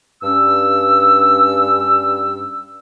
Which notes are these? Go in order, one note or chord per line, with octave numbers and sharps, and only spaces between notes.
G2 C#4 E6